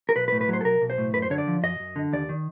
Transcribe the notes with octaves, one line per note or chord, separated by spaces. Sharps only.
A#4
B1 B4
B4
A2
B4
F#3 C5
A4
B1 A#4
B1
C5
A2
F#2 B4
C5
D3 C#5
D5
F3
F#2 D#5
F#2
D3
D#2 D5
D#3